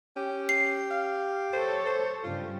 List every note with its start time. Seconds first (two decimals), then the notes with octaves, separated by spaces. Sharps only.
0.16 C#4 G4
0.49 C7
0.91 F5
1.53 A4 C5 C#5
1.86 C5
2.23 G2 C#3 G3 F4